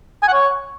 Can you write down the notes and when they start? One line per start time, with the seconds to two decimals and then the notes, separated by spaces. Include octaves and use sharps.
0.23 G#5
0.28 F#5
0.33 C#5